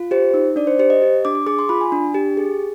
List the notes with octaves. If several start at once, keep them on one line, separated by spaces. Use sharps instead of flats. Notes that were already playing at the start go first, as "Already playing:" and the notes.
Already playing: F4
G4 C5
D#4
D4 D5
C5
G4 C5
D#5
G4
D4 D6
D6
G#4 D6
C6
F4 B5
G#5
D4
G4
G#4